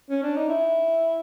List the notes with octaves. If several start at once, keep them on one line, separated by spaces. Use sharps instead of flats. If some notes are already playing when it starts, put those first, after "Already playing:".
C#4
D4
D#4
E4